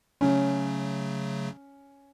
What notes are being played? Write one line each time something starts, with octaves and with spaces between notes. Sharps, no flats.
C#3 F#3 A3 C#4